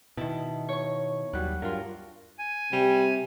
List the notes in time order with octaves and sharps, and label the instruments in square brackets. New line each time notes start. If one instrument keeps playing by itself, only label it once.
[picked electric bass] B2 D#3 [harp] E4 A5
[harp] C#5 C#6
[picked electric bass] D#2 G3 [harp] F#3 F#6
[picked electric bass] G2 [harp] F4 A#4
[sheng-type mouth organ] G#5
[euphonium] C3 [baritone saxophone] G3